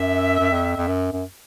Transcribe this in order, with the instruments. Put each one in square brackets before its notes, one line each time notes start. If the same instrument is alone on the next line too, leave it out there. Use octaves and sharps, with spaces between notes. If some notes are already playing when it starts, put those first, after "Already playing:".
Already playing: [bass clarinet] F#2 [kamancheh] E5
[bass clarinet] F#2
F2
F2
F#2
F#2